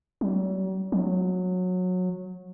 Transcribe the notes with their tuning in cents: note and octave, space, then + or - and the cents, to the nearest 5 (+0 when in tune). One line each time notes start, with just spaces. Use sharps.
F#3 +45
F#3 -20